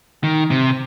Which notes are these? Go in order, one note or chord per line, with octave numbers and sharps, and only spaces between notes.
D#3
C3